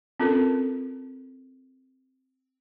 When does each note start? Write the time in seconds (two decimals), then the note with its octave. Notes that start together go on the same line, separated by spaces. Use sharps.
0.20 C4 C#4 F4 A4 A#4